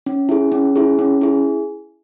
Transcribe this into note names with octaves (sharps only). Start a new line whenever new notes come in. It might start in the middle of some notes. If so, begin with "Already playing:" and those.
C#4
E4 G#4
C#4
E4 G#4
C#4
E4 G#4